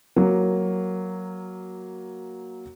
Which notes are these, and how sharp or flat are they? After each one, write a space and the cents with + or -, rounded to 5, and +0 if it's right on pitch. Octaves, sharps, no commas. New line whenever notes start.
F#3 +0 A#3 +0